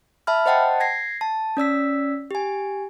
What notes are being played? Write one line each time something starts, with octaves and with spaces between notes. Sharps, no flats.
E5 A5 B5 F6
C5 D#5 F#5 G5 A5
G#6 A#6 C7
A5
C#4 D5 E6 B6
G4 G#5